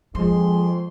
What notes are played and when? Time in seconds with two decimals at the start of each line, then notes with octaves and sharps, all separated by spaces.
0.15 F2 F3 G#3 C6